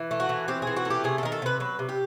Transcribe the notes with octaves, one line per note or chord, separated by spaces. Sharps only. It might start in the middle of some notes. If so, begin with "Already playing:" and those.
Already playing: E3
A3
F#4
E3
C4 G4
E3 G#4
F#4
A3
G4
C3 G#4
A4
D#3 A#4
A4
C3 B4
F#3 B4
C3
G4